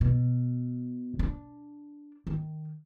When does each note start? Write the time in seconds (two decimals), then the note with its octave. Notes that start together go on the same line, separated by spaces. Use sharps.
0.01 B2
1.19 D4
2.27 D#3